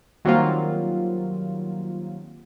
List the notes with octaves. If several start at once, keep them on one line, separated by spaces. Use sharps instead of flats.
D#3 F#3 G3 A#3 C4 F4